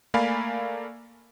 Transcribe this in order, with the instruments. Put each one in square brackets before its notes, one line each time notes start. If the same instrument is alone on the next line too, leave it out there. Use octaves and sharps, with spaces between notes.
[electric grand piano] A3 A#3 D5 F5 G#5 B5